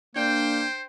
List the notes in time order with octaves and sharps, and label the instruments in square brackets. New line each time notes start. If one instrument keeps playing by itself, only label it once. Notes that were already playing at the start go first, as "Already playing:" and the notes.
[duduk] A#3 [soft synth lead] D4 [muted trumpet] C5 [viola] G5